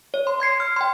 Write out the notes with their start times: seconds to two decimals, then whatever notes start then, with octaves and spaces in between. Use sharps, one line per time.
0.14 C#5
0.27 C6
0.40 C6 G#6 C7 C#7
0.60 F6
0.76 G5 C6